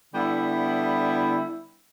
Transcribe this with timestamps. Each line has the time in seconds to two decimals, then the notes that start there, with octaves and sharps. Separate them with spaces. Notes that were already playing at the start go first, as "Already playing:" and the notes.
0.14 D3 G3 B3 E4